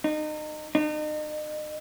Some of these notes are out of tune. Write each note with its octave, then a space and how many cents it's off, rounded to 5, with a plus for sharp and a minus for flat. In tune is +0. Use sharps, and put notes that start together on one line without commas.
D#4 -30
D#4 -40